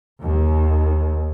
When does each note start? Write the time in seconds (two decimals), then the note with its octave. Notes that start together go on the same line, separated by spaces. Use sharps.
0.21 D#2